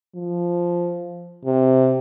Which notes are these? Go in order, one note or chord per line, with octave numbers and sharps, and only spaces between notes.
F3
C3